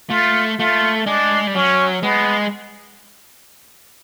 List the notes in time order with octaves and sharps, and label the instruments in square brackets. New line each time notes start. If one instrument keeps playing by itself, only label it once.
[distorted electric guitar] A3 [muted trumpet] F4
[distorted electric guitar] A3 [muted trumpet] F4
[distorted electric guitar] G#3 [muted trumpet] D4
[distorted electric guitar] G3
[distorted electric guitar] F#3 [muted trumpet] C#4
[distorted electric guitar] G#3 [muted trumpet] B3